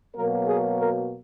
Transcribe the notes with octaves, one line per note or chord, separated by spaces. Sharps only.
B2 F#3 A#3 A#4
G#4
A#4